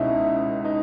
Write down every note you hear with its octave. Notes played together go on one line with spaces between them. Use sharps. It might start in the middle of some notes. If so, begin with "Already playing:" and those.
Already playing: C#2 B2 C#4 D#4 E4
D#4